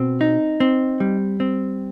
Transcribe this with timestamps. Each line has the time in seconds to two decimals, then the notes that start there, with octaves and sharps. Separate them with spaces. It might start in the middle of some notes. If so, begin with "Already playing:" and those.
Already playing: B2 C4
0.21 D#4
0.60 C4
1.00 G3
1.40 C4